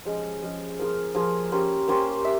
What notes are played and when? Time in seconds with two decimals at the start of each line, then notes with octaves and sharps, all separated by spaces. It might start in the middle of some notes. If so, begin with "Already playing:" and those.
0.05 F3 G#3 C#4
0.42 F3 G#3 C#4
0.79 F3 A#3 F4 G#4
1.15 F3 A#3 F4 G#4
1.52 A#3 C#4 G4 C5
1.88 A#3 C#4 G4 C5
2.25 E5